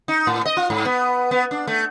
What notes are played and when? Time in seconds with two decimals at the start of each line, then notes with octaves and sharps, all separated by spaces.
0.08 D#4
0.27 A2
0.46 D#5
0.57 F4
0.70 G#2
0.85 B3
1.31 B3
1.51 D4
1.67 A3